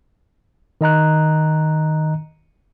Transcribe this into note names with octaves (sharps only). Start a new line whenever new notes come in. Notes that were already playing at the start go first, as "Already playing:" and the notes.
D#3 D#5 A#5 F#6